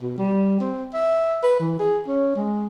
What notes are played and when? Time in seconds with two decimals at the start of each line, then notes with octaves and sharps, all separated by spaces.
0.02 B2
0.18 G3
0.60 C4
0.94 E5
1.43 B4
1.60 E3
1.79 G#4
2.07 C#4
2.36 G#3